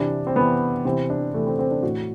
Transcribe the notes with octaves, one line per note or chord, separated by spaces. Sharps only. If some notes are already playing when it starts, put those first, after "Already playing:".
Already playing: C3 E3 D4
C4
C3 E3 B3
C3 E3 C4
D4
C3 E3 A3
C4
C4
D4
A2 E3 F#4